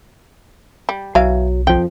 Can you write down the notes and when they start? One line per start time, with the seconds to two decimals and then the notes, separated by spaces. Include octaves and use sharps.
0.89 G3
1.15 B1 E3 F#3 F5
1.67 F2 F3 G5